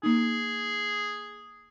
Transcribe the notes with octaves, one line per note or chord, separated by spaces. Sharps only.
A#3 D#4 G#4